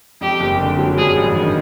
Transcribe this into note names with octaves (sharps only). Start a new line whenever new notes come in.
F2 G4
F#1
D3
F#3
G2 G#4
A1
D#3